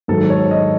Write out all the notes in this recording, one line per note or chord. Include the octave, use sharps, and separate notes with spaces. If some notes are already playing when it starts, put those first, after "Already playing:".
G#2 D#3 F#3 A4
C#5
D#5